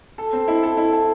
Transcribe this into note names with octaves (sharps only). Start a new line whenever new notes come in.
A4
C4
E4
A4
E4
A4